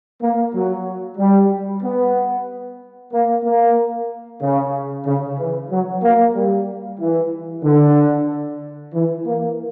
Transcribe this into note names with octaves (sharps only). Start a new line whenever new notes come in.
A#3
F#3
G3
B3
A#3
A#3
C#3
C#3
E3
F#3
A#3
G3
E3
D3
E3
A#3